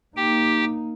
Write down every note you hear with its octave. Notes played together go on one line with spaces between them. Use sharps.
A#3 D#4 G4 G5